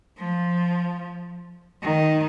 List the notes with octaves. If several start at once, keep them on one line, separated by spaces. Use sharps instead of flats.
F3
D#3